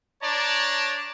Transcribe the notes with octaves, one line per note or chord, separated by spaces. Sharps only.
D4 C#5 D5 A5 A#5